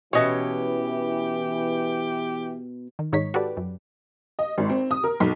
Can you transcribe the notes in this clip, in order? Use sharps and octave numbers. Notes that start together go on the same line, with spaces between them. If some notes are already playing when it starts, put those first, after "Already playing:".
B2 E3 C#4 G4 C#5 D#5
D#3
G#2 D#3 D#4 C#5 B6
F#4 G4 A4 B4 D5
F#2
D#5
G#1
C4
D#6
A#4
B1